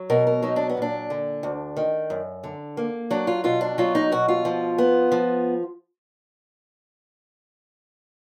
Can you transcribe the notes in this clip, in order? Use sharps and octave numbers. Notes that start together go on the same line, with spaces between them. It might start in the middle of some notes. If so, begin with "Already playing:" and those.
Already playing: F#3
B2 A#4
A#4
F#3 D#4
D4
B3
A#2 D4
D3
D2
D#3
F#2
D3
A#3
F#3 D4
F4
B2 F4
D4
F#3 F4
D#4
B2 F#4
F4
F3
B3
F3